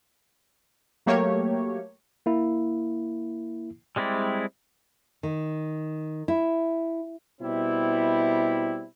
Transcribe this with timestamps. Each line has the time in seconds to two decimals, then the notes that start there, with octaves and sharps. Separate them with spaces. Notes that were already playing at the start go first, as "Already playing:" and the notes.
1.06 F#3 A3 A#3 G4 C#5
2.26 A#3 E4
3.96 G3 G#3 C4 E4 D5
5.23 D#3
6.28 E4
7.41 B2 G3 C4 E4